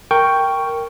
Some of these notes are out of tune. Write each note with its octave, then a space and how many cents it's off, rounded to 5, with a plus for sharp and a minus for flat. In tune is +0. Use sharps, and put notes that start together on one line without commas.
A#4 -10 G5 +0 C#6 +0